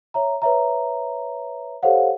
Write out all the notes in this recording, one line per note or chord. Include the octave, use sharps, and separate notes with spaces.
C#5 E5 A#5
B4 C#5 E5 A#5
G4 A4 C5 C#5 F5 F#5